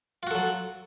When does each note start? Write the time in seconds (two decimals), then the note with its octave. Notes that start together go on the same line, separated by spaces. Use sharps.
0.23 F4
0.27 F#4
0.31 A4
0.35 F#3